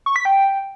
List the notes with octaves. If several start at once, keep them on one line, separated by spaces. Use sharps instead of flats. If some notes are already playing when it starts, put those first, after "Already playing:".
C#6
B6
G5